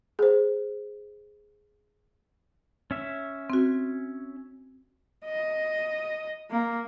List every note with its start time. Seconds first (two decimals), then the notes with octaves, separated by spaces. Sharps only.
0.19 G#4 C5
2.91 C#4 E5
3.50 C4 F#4
5.25 D#5
6.51 A#3